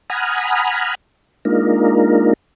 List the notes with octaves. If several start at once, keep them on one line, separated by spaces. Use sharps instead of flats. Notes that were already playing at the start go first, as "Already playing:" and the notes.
F#5 G#5 A#5 B5 D#6 F6
G#3 A#3 D4 D#4 F4 A#4